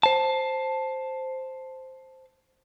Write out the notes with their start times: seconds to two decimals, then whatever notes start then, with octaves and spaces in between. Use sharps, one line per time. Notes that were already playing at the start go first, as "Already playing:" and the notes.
0.03 C5 A5